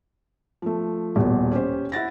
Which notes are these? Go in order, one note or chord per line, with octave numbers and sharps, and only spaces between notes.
F3 A3
D#1 E2 B2
C#4 G4 C5
E4 F#5 A6 A#6